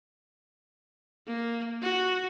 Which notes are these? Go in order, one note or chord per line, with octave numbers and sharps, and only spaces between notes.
A#3
F#4